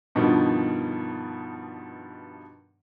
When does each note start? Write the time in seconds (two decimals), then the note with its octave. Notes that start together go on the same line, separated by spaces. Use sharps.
0.15 G2 B2 D#3 F3